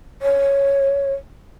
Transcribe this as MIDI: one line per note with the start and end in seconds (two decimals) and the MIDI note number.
0.22 1.14 73